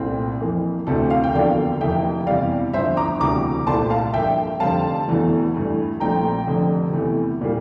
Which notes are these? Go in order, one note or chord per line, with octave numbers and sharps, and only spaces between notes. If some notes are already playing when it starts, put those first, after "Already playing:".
Already playing: C2 A#2 A3 C4
F2 E3 A#3
D2 C3 E3 A3 C4 A4
F5
G5
E1 E2 D3 F3 A#3 D5 F5
F1 F2 E3 A#3 E5 G5
E2 C3 E3 G3 D5 F5
G1 G2 F3 C5 E5
A#5 D6
E1 D2 C3 E3 G3 A#5 D6
C2 A#2 A3 C4 A5 C6
F5 A5
G2 F3 A#3 E5 G5
F1 F2 D3 G3 C4 F5 A5
E1 E2 E3 A3
G2 E3 A3
A#1 A#2 A3 C4 G5 A#5
F1 F2 D3
E2 C3 E3 A3
A#2 G3 A#3